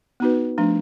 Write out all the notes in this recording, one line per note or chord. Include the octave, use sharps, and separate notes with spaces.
B3 D#4 F#4 B4
F3 A3 D4